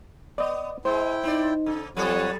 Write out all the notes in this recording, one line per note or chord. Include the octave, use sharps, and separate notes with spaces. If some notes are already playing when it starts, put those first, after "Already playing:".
B3 D5 D#5
G#3 E4 C5 G5
C4 D#4 D5
C#3 A4
F2 F#3 G3 A4 C#5 F#5